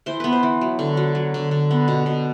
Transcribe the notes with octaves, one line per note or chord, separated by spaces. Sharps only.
E3 C5
B3 B4
C5
E3
F#3
D3
F#3
F#3
D3
D3
B3
B2
B2